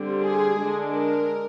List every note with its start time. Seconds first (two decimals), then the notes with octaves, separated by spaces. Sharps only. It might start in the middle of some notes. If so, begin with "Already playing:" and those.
Already playing: D3 G3 C4
0.23 G#4
0.57 D3 G#3 D4
0.92 A#4